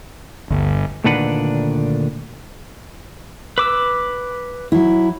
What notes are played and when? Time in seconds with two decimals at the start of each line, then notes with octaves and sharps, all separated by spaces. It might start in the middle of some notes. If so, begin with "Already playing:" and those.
0.50 G1 D2
1.04 D2 A#2 D#3 D4 B4 F#5
3.58 B4 D6 E6
4.72 F#3 E4